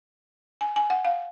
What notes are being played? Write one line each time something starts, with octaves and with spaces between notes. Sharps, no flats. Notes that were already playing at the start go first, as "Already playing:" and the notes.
G#5
G#5
F#5
F5